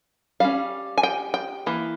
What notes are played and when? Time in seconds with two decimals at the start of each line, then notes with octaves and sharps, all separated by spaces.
0.40 G3 C#4 F5
0.98 G#5
1.03 G5
1.34 G5
1.66 E3 A#3